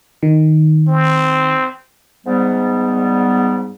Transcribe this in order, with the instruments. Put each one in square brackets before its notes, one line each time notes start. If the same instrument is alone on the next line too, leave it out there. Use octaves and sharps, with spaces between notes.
[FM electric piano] D#3
[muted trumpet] C4
[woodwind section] G#2 G3 B3